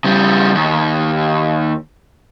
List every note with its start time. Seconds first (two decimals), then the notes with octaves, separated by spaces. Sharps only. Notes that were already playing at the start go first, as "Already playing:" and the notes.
0.04 C#3 G3
0.55 D#2